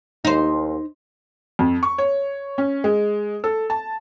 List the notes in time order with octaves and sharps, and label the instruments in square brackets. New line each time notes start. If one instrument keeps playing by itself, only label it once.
[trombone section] D#2 [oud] D#4 C5
[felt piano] F2
C#6
C#5
C#4
G#3
A4
A5